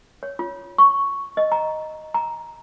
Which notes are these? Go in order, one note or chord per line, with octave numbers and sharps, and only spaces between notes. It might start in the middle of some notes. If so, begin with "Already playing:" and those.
C#5
F4
C#6
D#5
A#5
A#5